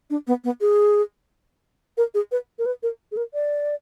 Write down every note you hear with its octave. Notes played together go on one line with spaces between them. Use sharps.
D4
B3
B3
G#4
A#4
G#4
B4
A#4
B4
A#4
G#4
A#4
D5